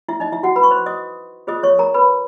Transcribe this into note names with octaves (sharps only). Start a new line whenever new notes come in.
E4 E5
D#4 D#5
E4 E5
F#4 F#5
B4 B5
C#6
C5 C6
D#5 D#6
F4 G#4 C5 D#5 D#6
C#5 C#6
A#4 A#5
B4 B5